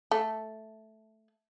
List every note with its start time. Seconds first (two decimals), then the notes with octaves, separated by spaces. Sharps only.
0.11 A3